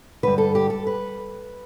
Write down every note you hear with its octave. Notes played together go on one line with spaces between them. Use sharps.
G2 D3 B4
A4
G4
A4
B4